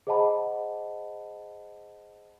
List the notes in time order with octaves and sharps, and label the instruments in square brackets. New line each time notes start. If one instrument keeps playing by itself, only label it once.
[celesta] G#4 C5 D#5 F#5 A5 B5